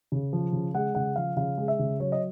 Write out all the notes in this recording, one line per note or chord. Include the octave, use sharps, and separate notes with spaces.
C#3
F3
C#3
G#3 F#5
C#3 F#5
F3 F5
C#3 F5
G#3
E5
C#3
F#3 C#5
D#5